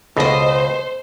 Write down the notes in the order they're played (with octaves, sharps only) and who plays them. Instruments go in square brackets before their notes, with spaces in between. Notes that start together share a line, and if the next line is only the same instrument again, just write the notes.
[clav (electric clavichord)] C#2 B2 [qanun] A4 D#5 [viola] C5